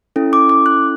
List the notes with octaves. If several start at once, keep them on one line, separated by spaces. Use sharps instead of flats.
C#4 E4 A4
D6
D6
F#6